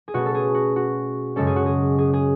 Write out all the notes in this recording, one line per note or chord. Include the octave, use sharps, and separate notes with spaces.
G#4
B2 A3 C#4 F#4
A4
G#4
F#4
F#4
F#2 C#3 G#3 C#4 A4
G#4
F#4
G#4
G#4
G#4